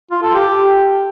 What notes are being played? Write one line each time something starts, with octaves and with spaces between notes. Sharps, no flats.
F4
A4
G4